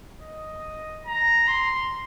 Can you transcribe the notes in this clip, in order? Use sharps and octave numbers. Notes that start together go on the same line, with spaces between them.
D#5
A#5
C6